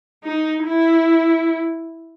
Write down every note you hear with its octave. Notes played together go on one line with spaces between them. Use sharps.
D#4
E4